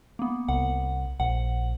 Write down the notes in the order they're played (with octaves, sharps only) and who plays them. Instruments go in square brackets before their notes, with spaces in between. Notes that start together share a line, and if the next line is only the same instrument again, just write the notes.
[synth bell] A#3 B3
[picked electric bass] C2 [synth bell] F#5
[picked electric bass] A#1 [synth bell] F#5